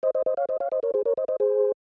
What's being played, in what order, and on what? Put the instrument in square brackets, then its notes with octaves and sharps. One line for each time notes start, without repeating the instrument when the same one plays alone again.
[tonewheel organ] C5 D#5
C5 D#5
C5 D#5
C#5 F5
C5 D#5
C#5 F5
C5 D#5
A#4 C#5
G#4 C5
A#4 C#5
C5 D#5
C5 D#5
G#4 C5